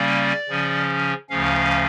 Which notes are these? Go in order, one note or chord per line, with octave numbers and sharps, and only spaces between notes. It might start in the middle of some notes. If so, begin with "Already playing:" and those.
Already playing: C#3 G3 A#3 C#4 D5
C#3 F3 C#4
D2 C#3 F3 C#4 F5